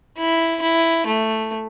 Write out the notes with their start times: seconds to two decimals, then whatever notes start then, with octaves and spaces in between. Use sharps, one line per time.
0.18 E4
0.62 E4
1.06 A3